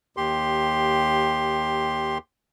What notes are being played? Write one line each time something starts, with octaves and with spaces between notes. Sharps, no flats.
D#2 G4 C6